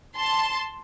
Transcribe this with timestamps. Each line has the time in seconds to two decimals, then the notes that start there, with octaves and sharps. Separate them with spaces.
0.17 A5 C6